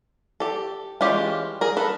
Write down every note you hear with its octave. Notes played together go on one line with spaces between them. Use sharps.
G4 A4
E3 G#3 C#4 F4 G4
G#4 A#4
A4 B4